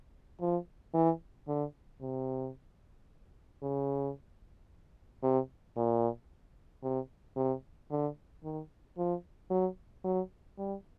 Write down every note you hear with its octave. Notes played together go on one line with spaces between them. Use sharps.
F3
E3
D3
C3
C#3
C3
A#2
C3
C3
D3
D#3
F3
F#3
F#3
G3